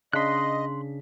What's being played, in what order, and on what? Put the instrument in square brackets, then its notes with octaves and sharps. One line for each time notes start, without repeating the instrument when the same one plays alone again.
[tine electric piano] C#3 D4 B6 [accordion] D#5 [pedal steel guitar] C6 F#6